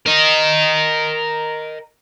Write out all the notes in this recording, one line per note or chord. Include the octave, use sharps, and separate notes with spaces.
A#4 D#5